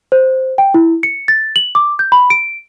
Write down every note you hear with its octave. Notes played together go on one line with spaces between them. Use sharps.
C5
G5
E4
C#7
A6
F#7
D6
G6
B5
D7